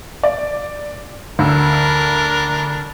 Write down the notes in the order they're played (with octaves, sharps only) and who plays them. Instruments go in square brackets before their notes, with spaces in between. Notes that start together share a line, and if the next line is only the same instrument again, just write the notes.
[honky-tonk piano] D5
[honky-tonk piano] D2 E6 [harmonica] D4 A#4